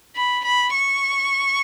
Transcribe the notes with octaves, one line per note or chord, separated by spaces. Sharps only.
B5
B5
C#6